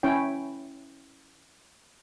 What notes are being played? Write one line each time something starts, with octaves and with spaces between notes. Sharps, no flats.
C#4 E4 C#5 G5